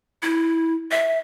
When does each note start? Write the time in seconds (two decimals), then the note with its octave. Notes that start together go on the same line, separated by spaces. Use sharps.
0.23 E4
0.91 E5